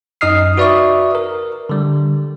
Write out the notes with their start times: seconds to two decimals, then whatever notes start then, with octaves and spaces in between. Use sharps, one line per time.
0.21 F#2 D#4 D#5 D#6 F6 C7
0.57 F#4 B4 D5 E5 C#6 D#6
1.15 A#4
1.69 D3 G3